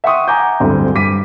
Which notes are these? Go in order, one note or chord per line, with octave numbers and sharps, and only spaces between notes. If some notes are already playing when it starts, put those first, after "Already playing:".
E5 F#5 G5 C6 C#6 D#6
F#5 G#5 A#5 D6 G6
D1 D2 G2 C4
G2 D6 B6 D#7